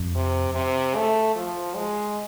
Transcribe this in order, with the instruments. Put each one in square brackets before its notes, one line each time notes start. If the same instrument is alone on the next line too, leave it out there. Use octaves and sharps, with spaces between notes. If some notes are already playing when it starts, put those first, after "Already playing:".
Already playing: [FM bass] F2
[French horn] C3
C3
A3
F3
G#3